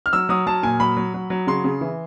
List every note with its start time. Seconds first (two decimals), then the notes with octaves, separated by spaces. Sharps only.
0.06 F6
0.13 F#3 E6
0.29 F#3 D#6
0.47 F#3 A5
0.63 A#2 G#5
0.80 F#3 B5
0.97 F#3
1.14 F#3
1.30 F#3
1.47 C#3 C6
1.64 C#3
1.81 E3